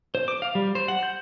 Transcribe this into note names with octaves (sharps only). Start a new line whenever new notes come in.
C5
D6
F5
G3
C5
F#5
G6